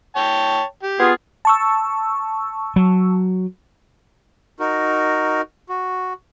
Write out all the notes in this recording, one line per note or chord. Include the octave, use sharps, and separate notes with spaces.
C#5 G5 A5
G4
B3 F4 G#4
A5 C#6 E6
F#3
D#4 F#4 A#4
F#4